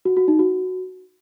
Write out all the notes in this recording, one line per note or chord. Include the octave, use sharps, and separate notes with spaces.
F#4
F#4
D#4
F#4